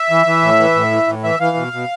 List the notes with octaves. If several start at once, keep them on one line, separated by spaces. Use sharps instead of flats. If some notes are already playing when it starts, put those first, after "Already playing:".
Already playing: E5
E3
E3
A2
E3
A2
E3
A2
E3 E5
E3 F5
B2
B2